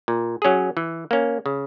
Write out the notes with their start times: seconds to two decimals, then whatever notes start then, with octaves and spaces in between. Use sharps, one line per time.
0.08 A#2
0.42 F#3 C#4 G#4
0.77 E3
1.11 A#3 C#4
1.46 C#3